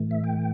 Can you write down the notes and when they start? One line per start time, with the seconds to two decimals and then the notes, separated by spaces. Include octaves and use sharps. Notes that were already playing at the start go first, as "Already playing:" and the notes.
Already playing: A2 E3 A3
0.11 E5
0.24 G5